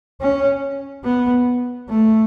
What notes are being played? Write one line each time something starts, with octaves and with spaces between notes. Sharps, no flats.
C#4
B3
A3